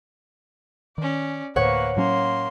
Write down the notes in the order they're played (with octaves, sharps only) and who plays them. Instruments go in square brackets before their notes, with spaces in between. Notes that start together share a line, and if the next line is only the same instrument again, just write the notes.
[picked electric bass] D#3 [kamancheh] C#4 D5
[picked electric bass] D2 A2 [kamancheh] A#3 B4 [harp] C#5 F#5
[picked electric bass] A2 F#3 C#4 [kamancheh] A#3 C6